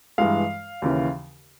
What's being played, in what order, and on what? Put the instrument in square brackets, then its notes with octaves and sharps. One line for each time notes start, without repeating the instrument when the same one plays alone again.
[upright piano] G2 E3 G#3 F5
D#2 C#3 E3